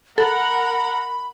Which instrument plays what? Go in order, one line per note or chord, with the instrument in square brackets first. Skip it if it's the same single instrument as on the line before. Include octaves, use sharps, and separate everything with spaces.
[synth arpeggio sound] A4 [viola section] A#4 F#5 A#5 [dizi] B5